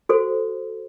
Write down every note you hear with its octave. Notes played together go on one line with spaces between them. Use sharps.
F#4 A4 C5